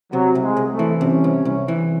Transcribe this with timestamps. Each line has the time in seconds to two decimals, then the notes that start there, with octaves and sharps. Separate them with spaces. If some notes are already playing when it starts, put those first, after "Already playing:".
0.12 C3 F#3
0.35 C2
0.42 G#3
0.57 C2
0.72 A3
0.79 E3
1.01 C3 C#4
1.24 C2
1.45 C2
1.68 E3